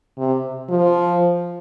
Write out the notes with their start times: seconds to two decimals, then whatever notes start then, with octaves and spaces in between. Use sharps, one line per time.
0.18 C3
0.70 F3